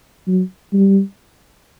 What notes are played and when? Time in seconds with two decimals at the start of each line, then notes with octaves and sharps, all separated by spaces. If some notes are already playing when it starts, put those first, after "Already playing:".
0.28 F#3
0.73 G3